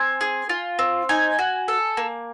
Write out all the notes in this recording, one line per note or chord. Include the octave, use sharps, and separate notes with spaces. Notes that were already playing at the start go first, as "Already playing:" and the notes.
Already playing: C4 G#5
G#4
F4
C4
D#4 G#5
F#4
A4
A#3